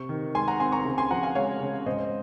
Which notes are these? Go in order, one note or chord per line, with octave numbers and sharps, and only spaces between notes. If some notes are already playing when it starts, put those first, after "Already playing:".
Already playing: C3 C#6
D#3
G#3 G#5 C6
F#5 A#5
C4 G#5 C6
A#5 C#6
C#3
G#5 C6
F3 F#5 A#5
F5 G#5
G#3 C#5 F5
C#3
G#2 C5 D#5